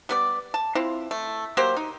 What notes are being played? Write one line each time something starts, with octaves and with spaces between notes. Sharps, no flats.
G3 B3 D5
A5
C4 E4 F4
A3
F#3 A#3 G4 C5
D#4